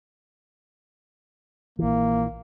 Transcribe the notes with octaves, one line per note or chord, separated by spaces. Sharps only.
A#1 E3 A#3